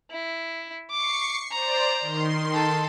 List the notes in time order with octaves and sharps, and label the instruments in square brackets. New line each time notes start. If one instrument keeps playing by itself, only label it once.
[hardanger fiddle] E4
[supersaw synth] C#6 C7 C#7 [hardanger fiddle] D6
[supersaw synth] C5 D5 [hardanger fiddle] A#5
[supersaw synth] D#3 C6
[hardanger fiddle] A4